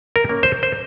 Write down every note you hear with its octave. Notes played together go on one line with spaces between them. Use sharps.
A#4
A#3 C#4
C5
C5